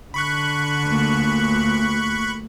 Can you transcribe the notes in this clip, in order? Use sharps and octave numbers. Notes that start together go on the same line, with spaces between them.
D3 B5 C#6 F#6
D2 A#2